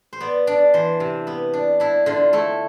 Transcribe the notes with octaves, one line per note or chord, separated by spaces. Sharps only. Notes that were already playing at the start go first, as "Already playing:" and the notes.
C5
B3 D5
D4 D5
E3 C5
C3
B3
D4
D4 E4
D3 F4
A3 E4